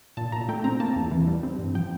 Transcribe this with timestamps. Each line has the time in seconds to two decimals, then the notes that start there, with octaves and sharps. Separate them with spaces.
0.17 A#2 A5
0.32 A#2 A#5
0.49 A3 G5
0.64 C4 A#5
0.80 A#3 A5
0.96 E2
1.11 E3
1.27 G3
1.43 C4
1.59 G2
1.75 F3 G5